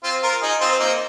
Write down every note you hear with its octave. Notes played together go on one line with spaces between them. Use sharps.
C4 F4
F4 A#4
D#4 G#4
C4 F4
C4
A#3 D#4